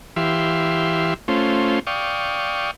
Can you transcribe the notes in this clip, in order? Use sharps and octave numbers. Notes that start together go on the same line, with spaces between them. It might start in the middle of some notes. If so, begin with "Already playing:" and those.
E3 G4 E5 F5 C6
A3 C#4 F4 C5
D5 F5 G5 C#6 D#6